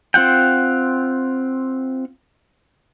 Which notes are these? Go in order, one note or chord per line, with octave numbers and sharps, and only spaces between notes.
C4 F4 F#5 G5